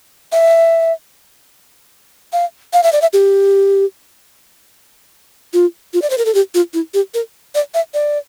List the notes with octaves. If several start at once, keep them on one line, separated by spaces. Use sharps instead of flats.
E5
F5
F5
E5
D5
E5
G4
F4
F4
D5
C5
A#4
A4
G4
F4
E4
G4
A#4
D5
E5
D5